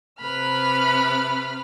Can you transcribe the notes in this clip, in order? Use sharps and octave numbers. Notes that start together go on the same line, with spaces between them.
C3 B4 B5 F6